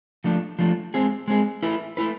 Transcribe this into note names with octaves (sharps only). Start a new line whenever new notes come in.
F3 A3 D4
F3 A3 D4
G#3 C4 G#4
G#3 C4 G#4
A3 E4 B4
A3 E4 B4